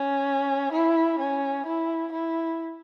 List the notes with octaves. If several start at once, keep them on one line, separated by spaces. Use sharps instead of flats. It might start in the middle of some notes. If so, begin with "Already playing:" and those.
Already playing: C#4
E4
C#4
E4
E4